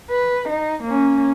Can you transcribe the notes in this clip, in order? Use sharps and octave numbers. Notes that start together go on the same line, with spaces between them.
B4
D#4
A#3 C#4